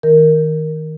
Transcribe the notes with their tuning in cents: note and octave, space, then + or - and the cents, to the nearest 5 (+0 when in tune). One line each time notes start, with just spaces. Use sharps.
D#3 +20 A#4 +0